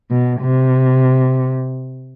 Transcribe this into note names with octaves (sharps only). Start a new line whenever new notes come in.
B2
C3